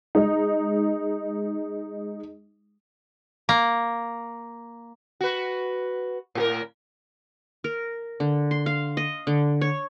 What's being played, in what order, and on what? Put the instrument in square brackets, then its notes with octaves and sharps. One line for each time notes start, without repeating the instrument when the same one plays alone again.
[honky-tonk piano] G#3 D#4
[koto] A#3
[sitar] F#4 B4
A2 G4 A#4
[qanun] A#4
D3
C6
F5
D#5
D3
C#5